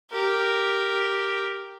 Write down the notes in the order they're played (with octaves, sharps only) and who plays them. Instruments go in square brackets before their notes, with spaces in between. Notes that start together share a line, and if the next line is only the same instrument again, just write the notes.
[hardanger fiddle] G4 A#4